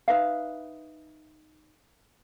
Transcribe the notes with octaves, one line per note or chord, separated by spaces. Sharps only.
D#4 B4 E5 F5